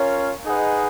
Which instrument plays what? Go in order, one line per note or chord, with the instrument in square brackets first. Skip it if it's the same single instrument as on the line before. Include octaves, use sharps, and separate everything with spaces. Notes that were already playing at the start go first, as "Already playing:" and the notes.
Already playing: [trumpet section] C#4 F4 A#4 C#5
D#4 G#4 B4 D#5 F#5